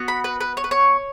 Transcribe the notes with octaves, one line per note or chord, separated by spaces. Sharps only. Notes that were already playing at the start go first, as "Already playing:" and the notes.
Already playing: B3 F#4
B5
B4
B4
C#5
B4
C#5